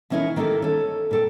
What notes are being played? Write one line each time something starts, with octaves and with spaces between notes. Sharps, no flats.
B2 E3 C#4 D#4 E4 A#4
D#3 A#3 G4 A4 A#4
C#4 A4
A#2 A4 G5